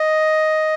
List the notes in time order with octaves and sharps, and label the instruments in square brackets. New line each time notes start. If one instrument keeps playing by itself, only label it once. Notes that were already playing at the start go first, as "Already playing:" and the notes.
Already playing: [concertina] D#5